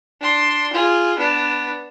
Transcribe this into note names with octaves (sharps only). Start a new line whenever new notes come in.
D4 C6
F4 G#4
B3 D4